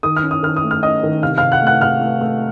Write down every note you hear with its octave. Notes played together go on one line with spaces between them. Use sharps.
D#3 D#6
F6
C#4
D#6
D#3 F6
D#6
A3
F6
C#4 D#5 D#6
D#3
C3 F5 F6
F5 F6
C3
F#5 F#6
A3
F#5 F#6
C3 F5 F6
A3
A3